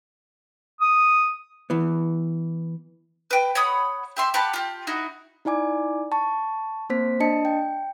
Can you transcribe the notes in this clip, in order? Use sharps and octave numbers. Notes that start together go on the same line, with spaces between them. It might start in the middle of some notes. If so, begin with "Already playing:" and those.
D#6
E3 B3
B4 G5
C#5 F#5 B5 D#6
G4 E5 C6
G4 F#5 A5 B5
F4 G4
D#4 E4 F#4
D#4 E4 D5 G#5 D6
A5 C#6
A#3 C4 C5 B6
D4 D#5 A5 C#7
G5